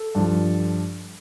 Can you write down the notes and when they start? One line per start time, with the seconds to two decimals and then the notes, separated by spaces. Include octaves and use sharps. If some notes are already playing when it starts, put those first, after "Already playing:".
Already playing: A4
0.15 G2 F3